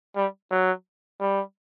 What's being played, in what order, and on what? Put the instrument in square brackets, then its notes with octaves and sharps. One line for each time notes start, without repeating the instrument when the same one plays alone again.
[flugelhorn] G3
F#3
G3